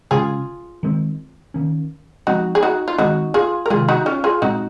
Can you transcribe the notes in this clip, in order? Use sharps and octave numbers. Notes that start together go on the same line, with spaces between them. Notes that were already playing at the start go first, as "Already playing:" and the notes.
C#3 G#3 C#4 F4 G#4
D#3 G#3 C4
D#3 A#3 C#4
F3 G#3 C4 D#4 F#4
G#4
D#4 F#4
F4
D#3 G#3 C4 D#4 F#4
F4 G#4
A#4
C3 D#3 G#3 F4 G#4
D#4 F#4
C#4 F4
F4 G#4
A#2 G#3 C4 D#4 F#4